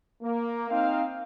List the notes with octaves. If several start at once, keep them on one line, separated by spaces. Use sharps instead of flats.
A#3
C4 D#4 F5